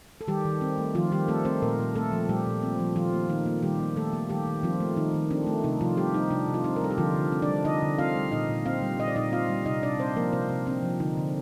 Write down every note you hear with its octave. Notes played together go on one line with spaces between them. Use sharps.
A4
D#3 G3 G4
D#3
C4
A3
D#3 F3 F4
D#3 G3 G4
A3 C4 A4
A3 C4 C5
A#2 A#3 A#4
A#2
A3 C4 A4
F3
A#2 G3 G4
A#2
C4
F3
D#3 F3 F4
A#3
D#3 D#4
A#3
D#3 G3 G4
A#3
D#3 A3 A4
A#3
D#3 G3 G4
D#3
F3 C4 F4
A3
D#3 D#4
D#3
C4 D4
A3
C3 D#4
C3 F3 F4
G3 C4 G4
G3 D#4
C3 D4
C3
F4
C4 D#4
A#4
G3 A4
G4
D3 F3 F4
D3
C4
D4 D5
G3
D3 D#4 D#5
D3
C4 F4 F5
G3
A#2 D#4 D#5
A#2
C4 F4 F5
G3
A#2 D#5
D5
A#2 D#4 D#5
C4 F4 F5
G3
C3 D#4 D#5
C3 D4 D5
C4 C5
F3 A#3 A#4
C3 C4 C5
C3
C4 D4
F3
D3 D#4
D3